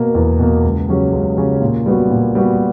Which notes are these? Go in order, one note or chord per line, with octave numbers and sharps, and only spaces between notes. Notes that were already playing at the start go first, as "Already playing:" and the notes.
Already playing: B2 A#3
E2
B2 A#3
C#2
C#3 F#3 C#4 G4
C#2
C#3 F#3 C#4 G4
A#2
G3 B3 F#4
A#2
G3 B3 F#4